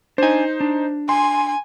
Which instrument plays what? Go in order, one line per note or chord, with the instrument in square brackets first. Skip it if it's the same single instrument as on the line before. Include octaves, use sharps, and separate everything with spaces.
[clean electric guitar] D4 G#5 [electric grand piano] D#4 C5
[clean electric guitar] D4
[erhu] G#5 [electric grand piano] C6